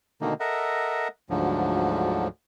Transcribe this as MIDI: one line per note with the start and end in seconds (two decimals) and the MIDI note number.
0.21 0.34 47
0.21 0.34 50
0.21 0.34 51
0.21 0.34 57
0.21 0.34 58
0.21 0.34 63
0.40 1.08 69
0.40 1.08 70
0.40 1.08 75
0.40 1.08 76
0.40 1.08 78
1.30 2.28 38
1.30 2.28 44
1.30 2.28 50
1.30 2.28 53
1.30 2.28 54